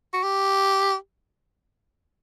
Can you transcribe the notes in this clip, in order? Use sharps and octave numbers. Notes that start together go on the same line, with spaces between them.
F#4
G4